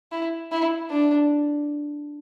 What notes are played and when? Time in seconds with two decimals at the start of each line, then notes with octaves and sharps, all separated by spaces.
0.12 E4
0.52 E4
0.90 D4